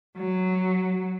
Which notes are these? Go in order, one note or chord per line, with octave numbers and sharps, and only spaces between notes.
F#3